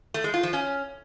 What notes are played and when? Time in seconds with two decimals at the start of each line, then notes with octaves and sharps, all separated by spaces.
0.14 A3
0.24 G#3
0.34 F4
0.43 F3
0.53 C#4